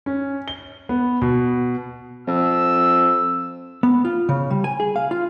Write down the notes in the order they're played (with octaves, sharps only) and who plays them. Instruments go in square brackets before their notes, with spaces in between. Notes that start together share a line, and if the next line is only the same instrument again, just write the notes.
[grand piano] C#4
G7
B3
B2
[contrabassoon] F2 [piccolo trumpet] E6
[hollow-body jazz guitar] B3
F4
C#3
G3
G#5
G#4
F5
F4